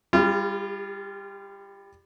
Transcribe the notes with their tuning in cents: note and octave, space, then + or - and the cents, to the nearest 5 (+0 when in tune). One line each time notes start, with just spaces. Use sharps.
G3 +20 F4 -25 G#4 -35